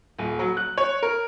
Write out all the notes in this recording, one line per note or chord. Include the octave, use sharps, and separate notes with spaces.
D#1
F#3
F#6
C#5
A#4